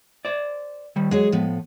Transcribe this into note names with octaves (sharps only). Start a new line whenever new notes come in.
C5 D5
D#3 G3
F#3 G#3 G#4 C#5
A2 F3 B3